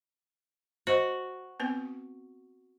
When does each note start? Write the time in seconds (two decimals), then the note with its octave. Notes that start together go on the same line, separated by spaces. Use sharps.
0.87 F#4 C5 D#5
1.60 B3 C4 B4